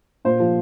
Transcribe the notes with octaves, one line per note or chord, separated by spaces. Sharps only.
A#2 C5
F3